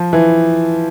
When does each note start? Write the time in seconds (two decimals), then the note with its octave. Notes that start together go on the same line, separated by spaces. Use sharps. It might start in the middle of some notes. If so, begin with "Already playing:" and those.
Already playing: F3
0.13 E3